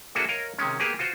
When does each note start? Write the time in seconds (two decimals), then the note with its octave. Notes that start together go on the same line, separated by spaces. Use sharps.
0.15 A#3 D4 F#4 G#4 A4 E5
0.29 A#4 C#5 D#5 F5
0.58 C3 D#3 G#3 C#4
0.80 A#3 B3 G4 G#4
0.99 F4 F#4 C5